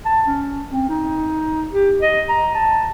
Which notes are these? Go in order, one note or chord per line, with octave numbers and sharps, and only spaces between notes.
A5
C#4
C4
D#4
G4
D#5
A#5
A5